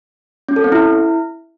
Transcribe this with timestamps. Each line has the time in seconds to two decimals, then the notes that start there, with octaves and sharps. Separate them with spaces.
0.49 C#4
0.56 A4
0.64 C4
0.72 E4